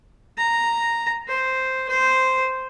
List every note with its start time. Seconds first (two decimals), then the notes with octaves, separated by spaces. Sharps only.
0.38 A#5
1.28 C5
1.89 C5